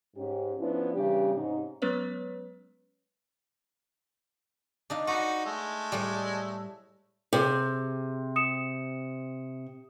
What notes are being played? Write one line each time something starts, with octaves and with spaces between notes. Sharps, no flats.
G#2 C#4 G4
F3 B3 C#4 D4 E4
C#3 E3 G3 B3 D4 G4
G#2 C3 C#4 D#4
F#3 G#3 B3 C#4 B4 C#5
D4 D#4 F5
D#4 F#4 B4
G#3 A3
A2 G3
C3 G#4
D#6 C#7 E7